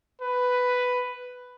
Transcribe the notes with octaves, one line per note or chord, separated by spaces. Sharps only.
B4